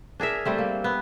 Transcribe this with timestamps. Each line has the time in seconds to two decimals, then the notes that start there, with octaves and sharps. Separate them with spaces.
0.20 D4 G#4 A#4 E5
0.45 G3 A3 C4
0.58 A#3
0.84 B3